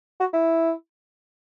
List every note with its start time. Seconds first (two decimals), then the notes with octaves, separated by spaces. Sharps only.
0.20 F#4
0.33 E4